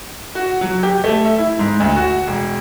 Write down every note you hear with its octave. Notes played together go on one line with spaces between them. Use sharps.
F#4
F#3
G4
A3
E5
E4
G#2
D2
F#4
E1